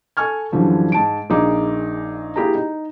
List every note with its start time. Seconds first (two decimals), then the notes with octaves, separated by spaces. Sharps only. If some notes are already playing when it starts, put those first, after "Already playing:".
0.17 A4 G#5 C#6 F6 G#6
0.52 F#2 D3 E3 F3 G3
0.92 G#2 A5 D7
1.30 A#1 A#3 D#4 G#4 D6
2.36 A#3 E4 G4 G#4 A#5
2.55 D#4